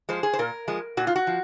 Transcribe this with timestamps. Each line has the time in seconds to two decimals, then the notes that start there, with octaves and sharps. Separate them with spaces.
0.09 F3 G#3 C5
0.23 G#4
0.33 C5
0.39 A#2 A#4
0.68 F3 G#3
0.97 A#2 F#4
1.07 F4
1.16 F#4
1.27 F3